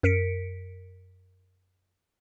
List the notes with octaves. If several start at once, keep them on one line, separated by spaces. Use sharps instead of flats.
F#2 A#4 B6 C#7 D7